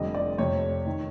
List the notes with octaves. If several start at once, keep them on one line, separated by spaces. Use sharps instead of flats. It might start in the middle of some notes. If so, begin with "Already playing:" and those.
Already playing: F1 F2 D3 G3 D#5
D5
F1 F2 C3 C#5
D#3